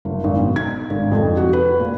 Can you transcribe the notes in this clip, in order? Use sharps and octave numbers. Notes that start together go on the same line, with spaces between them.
F#1
G#1
B2
G#6
G#1
F2
F#4
B4
A#2